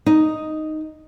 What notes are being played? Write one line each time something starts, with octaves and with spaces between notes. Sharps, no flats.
D#4